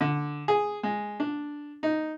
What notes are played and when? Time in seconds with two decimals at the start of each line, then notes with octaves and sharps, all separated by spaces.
0.01 D3
0.48 G#4
0.83 G#3
1.20 D4
1.83 D#4